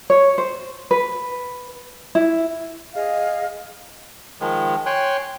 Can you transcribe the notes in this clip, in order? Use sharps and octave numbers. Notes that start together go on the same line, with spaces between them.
C#5
C5
B4
E4
G#4 D#5 F5
D#3 F3 G#3
C#5 G5 G#5 C6 F#6